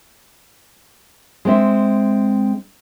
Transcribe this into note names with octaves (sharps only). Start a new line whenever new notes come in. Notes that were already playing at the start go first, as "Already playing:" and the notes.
G#3 C4 E5